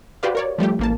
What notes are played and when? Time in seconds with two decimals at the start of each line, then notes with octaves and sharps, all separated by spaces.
0.23 F#4 G4 B4 C5 D5 F5
0.35 A#4 C#5 D5
0.58 F3 G3 A3 G4
0.79 A1 A#3 A5